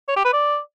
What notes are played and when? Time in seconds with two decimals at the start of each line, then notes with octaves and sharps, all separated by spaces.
0.08 C#5
0.17 G4
0.25 B4
0.33 D5